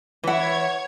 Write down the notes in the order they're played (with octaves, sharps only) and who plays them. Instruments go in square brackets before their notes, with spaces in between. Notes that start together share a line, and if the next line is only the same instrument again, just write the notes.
[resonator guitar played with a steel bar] E3 E4 [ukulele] B4 F#5 [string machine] C#5 G#6